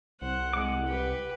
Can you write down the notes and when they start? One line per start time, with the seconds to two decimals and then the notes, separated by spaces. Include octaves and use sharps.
0.22 C2 C5 F#5
0.53 G#3 F#5 D6
0.88 G4 B4